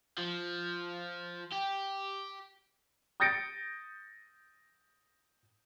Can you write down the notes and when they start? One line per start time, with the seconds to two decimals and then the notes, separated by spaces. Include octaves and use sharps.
0.18 F3
1.52 G4
3.20 D#6 G6 A6 A#6 C#7 D7